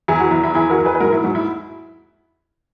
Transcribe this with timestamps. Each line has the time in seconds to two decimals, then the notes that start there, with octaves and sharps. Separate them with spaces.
0.08 E2 E4 G#4
0.20 F#4
0.31 E2 E4
0.43 E4
0.54 E2 E4 G#4
0.70 F#4 A#4
0.78 E2
0.85 G#4 B4
0.95 B4
1.00 G#2 F#4 A#4
1.13 E4
1.24 G#2 F#4
1.35 E4